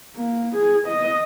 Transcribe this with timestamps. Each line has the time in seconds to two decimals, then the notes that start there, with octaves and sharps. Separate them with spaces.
0.16 A#3
0.55 G#4
0.87 D#5